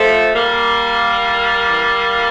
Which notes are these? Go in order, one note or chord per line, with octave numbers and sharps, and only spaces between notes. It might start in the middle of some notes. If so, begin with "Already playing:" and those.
Already playing: F3 A3
A#2 G3 A#3
A2
E3
A2